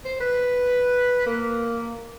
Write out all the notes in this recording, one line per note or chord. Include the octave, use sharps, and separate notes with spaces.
C5
B4
A#3